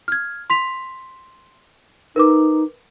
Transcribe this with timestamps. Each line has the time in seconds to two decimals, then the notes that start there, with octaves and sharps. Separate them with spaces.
0.08 F6 G#6
0.50 C6 B6 F7
2.16 D#4 A#4 B4 D6